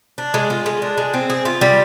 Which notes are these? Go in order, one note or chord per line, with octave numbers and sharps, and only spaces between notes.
D4
G#3
F4
G#3
D4
G#3
C4
G#4
F4
G3